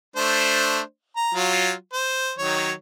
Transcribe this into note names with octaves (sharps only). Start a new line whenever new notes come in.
A3 D4 C5
A#5
F#3 F4
C5
D#3 F#3 C#5